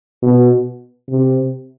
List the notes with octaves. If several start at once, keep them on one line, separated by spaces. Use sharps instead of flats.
B2
C3